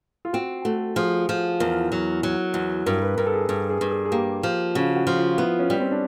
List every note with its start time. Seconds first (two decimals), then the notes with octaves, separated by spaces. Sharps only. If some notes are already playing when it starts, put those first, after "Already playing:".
0.25 F4
0.33 C4 F#4
0.65 A3 F#4
0.96 F3 G#4
1.29 F3
1.60 E2 A#4
1.92 F#3
2.23 F#3
2.54 E2
2.86 G2 A#4
3.02 B4
3.17 G2 A#4
3.26 A4
3.33 G#4
3.49 G2
3.70 G#4
3.81 G2
3.91 G#4
4.05 G#4
4.12 A#3 G4
4.43 F3
4.75 C#3 F#4
4.96 F#4
5.07 F3
5.17 F4
5.38 B3 E4
5.59 C#4
5.70 G3
5.80 C4
5.92 D4